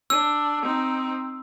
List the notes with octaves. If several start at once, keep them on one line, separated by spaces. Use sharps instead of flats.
D4 E6
C4 D#4